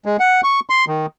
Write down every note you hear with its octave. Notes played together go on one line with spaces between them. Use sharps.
G#3
F#5
C#6
C6
D#3